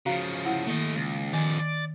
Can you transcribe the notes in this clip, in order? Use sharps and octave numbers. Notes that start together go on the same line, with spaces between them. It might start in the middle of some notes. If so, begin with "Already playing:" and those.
C#3 F3 F#4 F5 A#5
E4 F#5
D#3 A3 A#3 D#5
C#2
F2 D#3 D5 G#5
D5